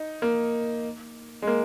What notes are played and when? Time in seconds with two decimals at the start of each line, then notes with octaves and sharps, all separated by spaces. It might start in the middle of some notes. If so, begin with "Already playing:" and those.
Already playing: D#4
0.22 A#3
1.42 G#3
1.47 A#3